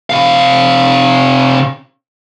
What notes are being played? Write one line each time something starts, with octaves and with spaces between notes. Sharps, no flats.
C3 F5